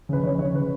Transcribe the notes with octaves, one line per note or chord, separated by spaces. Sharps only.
C#3 B4
C#3 C#5
C#3 C#5
C#3 B4